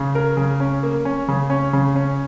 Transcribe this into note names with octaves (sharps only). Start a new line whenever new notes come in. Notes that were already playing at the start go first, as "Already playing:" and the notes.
Already playing: C#3
A#4
C#3
C#4
A#3
C#4
C#3
C#4
C#3
C#4